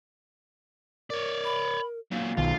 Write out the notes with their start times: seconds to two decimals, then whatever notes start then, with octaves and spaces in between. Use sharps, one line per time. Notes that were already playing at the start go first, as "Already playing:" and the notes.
1.10 A#4 C#5 D5
1.45 B5
2.12 A#2 F#3 F5
2.37 B1 D#3 F4